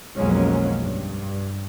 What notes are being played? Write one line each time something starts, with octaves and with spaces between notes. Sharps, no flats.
B1 F2 F#3 G#3 A#3 C#4
G2